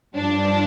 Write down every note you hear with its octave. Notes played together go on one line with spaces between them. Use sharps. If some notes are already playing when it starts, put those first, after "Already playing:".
G2 F3 D4